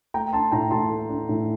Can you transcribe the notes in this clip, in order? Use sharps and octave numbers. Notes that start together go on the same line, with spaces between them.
A3 G5 A#5
D4 A5 C6
A2 G5 A#5
A2 A5 C6
A3
D4
A2